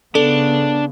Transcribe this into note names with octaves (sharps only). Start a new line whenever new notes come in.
C#3 B3 D4 A4